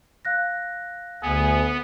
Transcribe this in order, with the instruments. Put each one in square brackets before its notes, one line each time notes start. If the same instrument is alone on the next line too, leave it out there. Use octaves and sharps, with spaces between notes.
[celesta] F5 F#6 A#6
[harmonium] D2 [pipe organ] B3 [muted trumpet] G#4